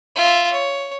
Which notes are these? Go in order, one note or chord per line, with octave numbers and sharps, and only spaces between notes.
F4 E5
C#5